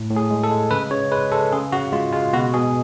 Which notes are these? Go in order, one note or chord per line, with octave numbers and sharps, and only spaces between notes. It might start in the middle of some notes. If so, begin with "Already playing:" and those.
Already playing: A2
A2
G#4
G#3
A4
G#3
C#3 B4
C#3 C#5
G#3 B4
G#3 A4
C#3 G#4
C#3 F#4
G#3 F4
G#3 F4
B2 F#4
B2 G#4